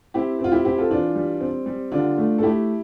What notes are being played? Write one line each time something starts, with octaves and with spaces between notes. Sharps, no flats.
C4 E4 G4
C4
F4
E4 G4
C4 E4 G4
F4 A4
E3 D4 F4
G3
C4
G3
D3 D4 F4
A3
A4
A3 E4 G4